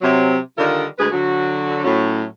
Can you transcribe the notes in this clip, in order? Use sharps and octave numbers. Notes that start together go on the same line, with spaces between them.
C3 F#3
D3 D#3 G3 D#4 F4 A#4
D2 G#3 G#4 B4
D3 F#3 F#4
A2 F#3 C#4